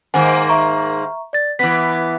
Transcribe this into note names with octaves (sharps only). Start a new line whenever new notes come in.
G#2 D#3 A#3 C5 F#5 G#5
E5 A#5 C#6
D5 A6
E3 B3 B6